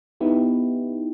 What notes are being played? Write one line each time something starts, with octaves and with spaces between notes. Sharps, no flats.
B3 D#4 E4 G4